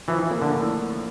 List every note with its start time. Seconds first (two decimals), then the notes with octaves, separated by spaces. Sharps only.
0.08 E3 F3
0.31 A#3
0.42 D3
0.53 A2